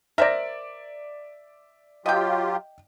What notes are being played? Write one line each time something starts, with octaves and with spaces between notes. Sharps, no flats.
A#4 C5 D5 E5 A#5
F#3 F4 G4 D#5 G5